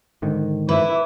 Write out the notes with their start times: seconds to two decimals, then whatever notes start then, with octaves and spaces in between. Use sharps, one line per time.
0.22 G#2 D3 D#3
0.69 E4 B4 D6